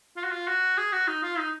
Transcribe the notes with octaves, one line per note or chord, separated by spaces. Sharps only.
F4
F#4
F4
F#4
G#4
F#4
D#4
F4
D#4